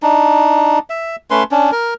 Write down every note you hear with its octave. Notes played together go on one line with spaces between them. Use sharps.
D4 D#4
E5
A3 C#4 B4 C6
C#4 D4
A#4